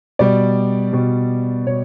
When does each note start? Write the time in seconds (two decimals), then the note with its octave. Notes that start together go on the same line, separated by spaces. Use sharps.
0.19 B2 G3 D5
0.93 B2 G3
1.67 B2 C#5